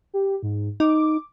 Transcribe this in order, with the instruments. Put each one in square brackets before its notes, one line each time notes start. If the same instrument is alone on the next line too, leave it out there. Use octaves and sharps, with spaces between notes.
[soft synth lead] G4
G#2
[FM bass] D#4 [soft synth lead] D6